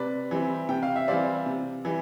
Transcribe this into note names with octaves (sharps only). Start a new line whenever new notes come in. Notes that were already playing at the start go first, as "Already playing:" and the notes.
Already playing: C3 B4 D5
E3 G3 C4
C3 G5
F5
E5
E3 G3 C4 D5 F5
C3
E3 G3